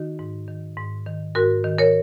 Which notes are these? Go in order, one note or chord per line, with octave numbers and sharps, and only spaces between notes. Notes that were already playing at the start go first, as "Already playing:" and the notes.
Already playing: D#3 D#4 F#4
G#2
D#3
G#2
D#3
G#2 F#4 A#4
D#3
A#4 C#5